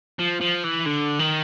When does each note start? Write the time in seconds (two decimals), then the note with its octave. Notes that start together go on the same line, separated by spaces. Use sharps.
0.19 F3
0.41 F3
0.64 E3
0.86 D3
1.19 D#3